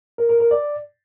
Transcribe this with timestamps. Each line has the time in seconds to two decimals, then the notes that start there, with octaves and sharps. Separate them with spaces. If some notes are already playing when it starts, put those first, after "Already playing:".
0.18 A#4
0.29 A#4
0.40 A#4
0.51 D5